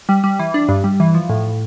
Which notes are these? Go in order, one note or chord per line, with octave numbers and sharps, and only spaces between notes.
G3
G3
E3
D4
G2
G3
E3
F3
A2